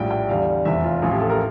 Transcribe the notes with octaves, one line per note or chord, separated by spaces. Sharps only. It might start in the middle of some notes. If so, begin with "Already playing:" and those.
Already playing: A#1 A2 G3 G5
G5
E2 D3 G3 F5
F1 E2 E3 E5
F4
A1 A2 F3 F4
G4
A4
A#4